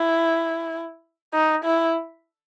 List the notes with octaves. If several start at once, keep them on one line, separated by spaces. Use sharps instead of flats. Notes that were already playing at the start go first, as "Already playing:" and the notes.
Already playing: E4
D#4
E4